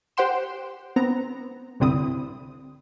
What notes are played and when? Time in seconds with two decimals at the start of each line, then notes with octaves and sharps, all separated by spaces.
0.17 G4 C5 F#5 G5 C6 E7
0.96 B3 C4 A#5
1.80 C2 G2 D3 C4 E4 D#6